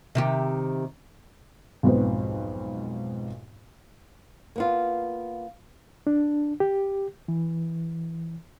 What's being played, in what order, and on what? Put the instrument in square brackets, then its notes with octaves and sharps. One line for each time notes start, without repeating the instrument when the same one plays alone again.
[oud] C3 D#3 G4
[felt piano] B1 F2 G#2 B3 B4 C5
[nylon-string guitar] A#3 B3 F4
[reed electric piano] D4
G4
E3